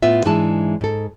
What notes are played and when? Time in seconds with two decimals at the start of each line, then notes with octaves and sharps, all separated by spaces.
0.02 A2 B3 F4 E5
0.25 G#2 E3 G#3 D4 E4 A5
0.81 G#2 A4